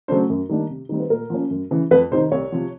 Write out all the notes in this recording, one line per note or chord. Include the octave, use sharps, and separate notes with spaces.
C#3 F#3 A3 D4 C5
F#2
D#3 G3 A#3 D4
C3
D#3 G3 C4
B4
A#2 A#4
F3 A#3 C#4
F#2
C#3 E3
F2 B4
C3 D#3 C5
C2 C#5
C3 F3